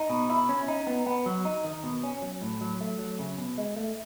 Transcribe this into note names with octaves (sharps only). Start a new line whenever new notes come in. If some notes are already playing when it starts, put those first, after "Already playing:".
Already playing: D#4
B2
E4
C#4
D#4
B3
B3
F#3
D#4
D#3
B2
C#4
F#3
A2
F#3
A3
F#3
C#3
B2
G#3
A3